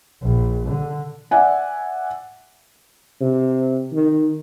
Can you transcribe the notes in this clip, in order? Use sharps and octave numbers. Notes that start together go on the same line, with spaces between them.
A#1
D3
D5 E5 F#5 G#5
C3
D#3